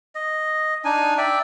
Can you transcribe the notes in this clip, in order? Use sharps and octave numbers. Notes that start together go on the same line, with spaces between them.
D#5
D4 D#4 G#5
D5 E5 G5